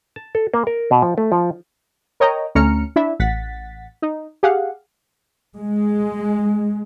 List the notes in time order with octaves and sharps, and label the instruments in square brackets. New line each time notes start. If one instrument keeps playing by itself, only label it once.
[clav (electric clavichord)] A5
A4
A#3
A#4
B2
F3
A3
F3
[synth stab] A#4 C#5 D#5 G5 A#5
D2 A3 C#4 A#5 F6 C#7
D4 E4 E5
A1 F#5 A6 B6
D#4
G4 G#4 F5 F#5
[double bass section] G#3